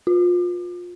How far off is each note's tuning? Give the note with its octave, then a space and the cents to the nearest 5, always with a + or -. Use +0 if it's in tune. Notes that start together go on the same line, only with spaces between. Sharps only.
F4 +25